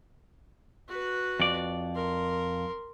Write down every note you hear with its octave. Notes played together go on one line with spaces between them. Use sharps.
F#4 B4
F2 D5
A#4 C6